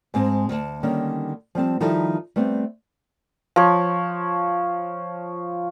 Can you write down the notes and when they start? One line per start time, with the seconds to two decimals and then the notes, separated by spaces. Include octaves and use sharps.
0.14 G#2 G#3 C4 G#5 A5
0.49 D2 A5
0.83 D3 D#3 G3 A#3 C#4
1.55 F3 G3 C4 A5
1.80 D#3 F3 G3 D#4 E4 A4
2.36 G3 A3 B3 C4
3.56 F3 C#5